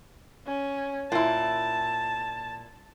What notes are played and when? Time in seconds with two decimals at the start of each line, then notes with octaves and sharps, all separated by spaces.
0.47 C#4
1.12 A#2 E4 A5